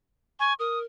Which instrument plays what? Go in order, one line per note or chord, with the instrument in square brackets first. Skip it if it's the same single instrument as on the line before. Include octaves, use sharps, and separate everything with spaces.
[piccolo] G#5 [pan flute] C#6
[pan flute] A#4 [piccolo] D#6